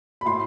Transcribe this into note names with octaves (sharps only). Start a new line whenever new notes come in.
B5
A2 C6